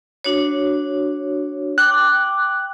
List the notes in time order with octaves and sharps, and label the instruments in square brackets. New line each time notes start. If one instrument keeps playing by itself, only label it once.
[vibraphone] D4 F#4 C#5
[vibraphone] G5 D6 [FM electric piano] F#6